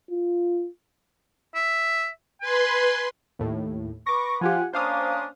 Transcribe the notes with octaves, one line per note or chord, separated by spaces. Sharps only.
F4
E5
B4 G#5 C6
D#2 A2
B4 C#6 D6 A#6
F3 F4 G4 F#5 G#5
A#3 C#4 D4 C5 F5 D#6